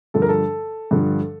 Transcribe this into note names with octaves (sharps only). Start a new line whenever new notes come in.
G2 D3 F3 A4
A#4
A4
G2 D3 F3